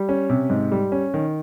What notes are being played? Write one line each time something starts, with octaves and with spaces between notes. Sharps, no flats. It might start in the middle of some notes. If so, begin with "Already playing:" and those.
Already playing: G3
C#4
C3
G#2
G3
C#4
D#3